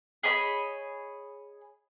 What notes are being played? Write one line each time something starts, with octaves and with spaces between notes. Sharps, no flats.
G#4 C#5 D#5 B5